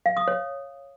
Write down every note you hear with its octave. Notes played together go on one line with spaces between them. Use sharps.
F5
D#6
C#5